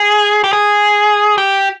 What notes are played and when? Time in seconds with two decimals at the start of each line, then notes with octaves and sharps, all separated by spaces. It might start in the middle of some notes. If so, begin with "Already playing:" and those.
Already playing: G#4
0.44 G4
0.53 G#4
1.38 G4